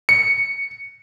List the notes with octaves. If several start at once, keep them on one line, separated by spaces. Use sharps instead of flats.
C#7